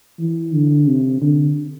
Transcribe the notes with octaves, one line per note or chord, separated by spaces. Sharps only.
E3
D3
C3
D3